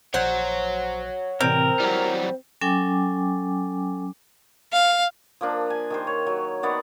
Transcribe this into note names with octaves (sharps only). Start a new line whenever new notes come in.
A#1 C5 C#5 F#5 F#6 G#6
A2 C3 E3 C4 A#4
F#3 G3 E4 G4 C#5
F#3 C#4 A4 G5 G#5 D6
F5
F3 A#3 D4
G#5
D#3 G4 C5
C#5
F#3
D#3 B3 D5 F#5